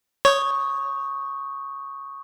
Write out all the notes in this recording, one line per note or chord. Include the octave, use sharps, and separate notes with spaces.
C#5 C#6 D#6 G6